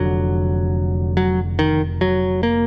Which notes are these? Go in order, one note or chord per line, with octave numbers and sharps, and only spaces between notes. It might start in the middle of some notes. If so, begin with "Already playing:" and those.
Already playing: F1 F2 D3 F#3
F#3
D#3
F#3
A#3